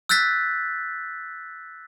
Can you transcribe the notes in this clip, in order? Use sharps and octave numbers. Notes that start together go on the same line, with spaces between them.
E6 F#6 G6 A6 B6